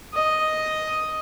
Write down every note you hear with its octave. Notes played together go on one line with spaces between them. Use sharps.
D#5